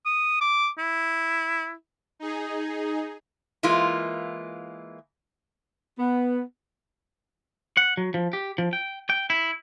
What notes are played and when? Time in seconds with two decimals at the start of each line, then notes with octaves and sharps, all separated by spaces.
0.06 D#6
0.41 D6
0.78 E4
2.19 D#4 G#4
3.63 E3 G#3 A#3 F4
5.99 B3
7.77 F#5
7.97 F#3
8.14 F3
8.33 G4
8.58 F3
8.73 G5
9.10 G5
9.30 E4